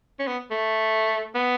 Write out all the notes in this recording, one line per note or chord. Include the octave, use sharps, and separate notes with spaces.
C#4
B3
A3
B3